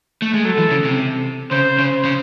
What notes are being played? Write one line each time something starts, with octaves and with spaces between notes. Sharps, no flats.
A3
G#3
F#3 A4
E3
C#3
C3
C#3 C5
C#3
C#3